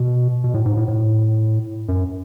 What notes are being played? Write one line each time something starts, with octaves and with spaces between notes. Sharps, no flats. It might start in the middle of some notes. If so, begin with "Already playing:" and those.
Already playing: B2
B2
A2
G#2
A2
A2
F#2